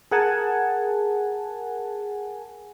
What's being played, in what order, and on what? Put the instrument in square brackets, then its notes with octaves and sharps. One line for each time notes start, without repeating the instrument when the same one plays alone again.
[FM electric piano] G#4 A#4 F#5 G#5 A5